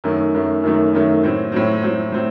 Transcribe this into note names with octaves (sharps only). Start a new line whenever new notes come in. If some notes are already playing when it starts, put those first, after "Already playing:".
F#2 D#3 F#3 A3
F#2 D#3 F#3 A3
F#2 D#3 F#3 A3
F#2 D#3 F#3 A3
A2 F#3 C4
A2 F#3 C4
A2 F#3 C4
A2 F#3 C4